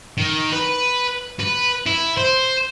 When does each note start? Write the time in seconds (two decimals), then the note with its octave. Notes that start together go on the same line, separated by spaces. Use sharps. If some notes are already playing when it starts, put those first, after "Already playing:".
0.18 D#3
0.53 B4
1.39 B4
1.86 E4
2.17 C5